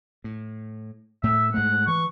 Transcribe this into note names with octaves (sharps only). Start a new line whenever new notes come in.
A2
A2 A3 E5
G#2 G#3 A3 F#5
E3 C#6